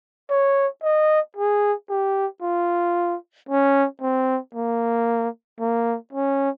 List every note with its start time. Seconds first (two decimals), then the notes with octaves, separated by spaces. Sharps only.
0.30 C#5
0.83 D#5
1.36 G#4
1.89 G4
2.42 F4
3.49 C#4
4.02 C4
4.55 A#3
5.60 A#3
6.13 C#4